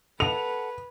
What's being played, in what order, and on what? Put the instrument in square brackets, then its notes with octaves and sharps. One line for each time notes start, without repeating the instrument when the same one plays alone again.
[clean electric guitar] A4 F#5 A5 [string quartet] B4 [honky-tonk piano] F7